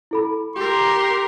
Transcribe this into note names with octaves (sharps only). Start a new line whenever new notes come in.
E4 A4 B5
G4 A#4 C6